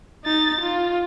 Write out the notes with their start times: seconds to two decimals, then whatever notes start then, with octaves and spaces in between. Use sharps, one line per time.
0.25 D#4 A6
0.62 F4